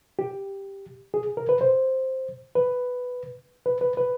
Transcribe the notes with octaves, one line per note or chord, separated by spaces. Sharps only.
G4
G#4
A#4
B4
C5
B4
B4
B4
B4